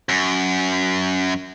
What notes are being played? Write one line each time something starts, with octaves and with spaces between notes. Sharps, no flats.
F#2